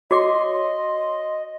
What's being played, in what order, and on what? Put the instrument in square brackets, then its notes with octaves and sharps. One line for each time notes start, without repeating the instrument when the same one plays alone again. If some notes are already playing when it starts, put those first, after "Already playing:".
[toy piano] F#4 D6 [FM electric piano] C#5 C6 [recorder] D#5